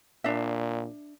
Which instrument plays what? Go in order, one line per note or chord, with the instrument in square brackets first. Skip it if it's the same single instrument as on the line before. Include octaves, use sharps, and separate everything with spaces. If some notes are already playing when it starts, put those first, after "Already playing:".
[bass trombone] A#2 [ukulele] D4 E5